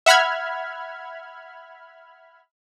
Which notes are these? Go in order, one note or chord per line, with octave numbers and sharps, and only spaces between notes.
E5 F#5 B5 F6 G#6